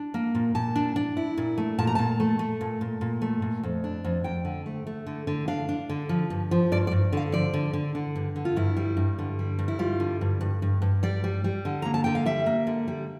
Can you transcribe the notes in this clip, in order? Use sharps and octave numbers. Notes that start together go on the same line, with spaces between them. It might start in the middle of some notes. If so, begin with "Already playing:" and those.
Already playing: D4
A#3
A#2
A#2 A5
D4
D4
E4
A#2
A3
A#2 A5
A#5
A#2 A5
A3
A3
A#2
A#2
A#2
A3
A#2
F2
D4
F2
F2 G5
D3
A3
A3
D3
D3
D4 F5
D4
D3
F3
G2
F3
G2 D5
D5
G2
D3 F5
F3 D5
D3
D3
D3
G2
D3
F4
G2 E4
G3
G2
D3
G3
G2
E4
G3 F4
D3
G2
G2
G2
G2
G3 D5
G3
G3
D3
A#3 A#5
A5
D3 G5
F5
G3 E5
A#3
D3
G3